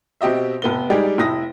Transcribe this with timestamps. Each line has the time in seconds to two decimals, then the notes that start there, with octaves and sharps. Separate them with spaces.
0.21 B2 C4 G4 D#5 E5
0.62 F1 B3 G7
0.90 G3 G#3 D4 D#4 G4 G#4
1.18 F1 E4 D#6 A#6